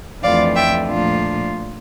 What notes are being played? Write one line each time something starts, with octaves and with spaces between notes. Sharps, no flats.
F2 E3 A3 D4 F4 D5 F5
E5 G5
A#2 F3 A3 D4 F4